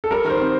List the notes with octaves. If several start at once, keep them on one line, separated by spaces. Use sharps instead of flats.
A4
G3 A#4
D#3 A#4
C5
C4